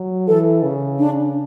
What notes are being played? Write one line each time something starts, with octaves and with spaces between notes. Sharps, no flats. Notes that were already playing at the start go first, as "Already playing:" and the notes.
Already playing: F#3
E3 A4
C#3
D4